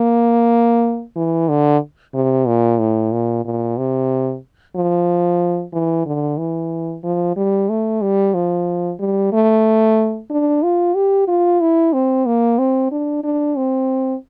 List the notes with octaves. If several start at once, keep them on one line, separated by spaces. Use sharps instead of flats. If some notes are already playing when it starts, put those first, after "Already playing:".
Already playing: A#3
E3
D3
C3
A#2
A2
A#2
A#2
C3
F3
E3
D3
E3
F3
G3
A3
G3
F3
G3
A3
D4
F4
G4
F4
E4
C4
A#3
C4
D4
D4
C4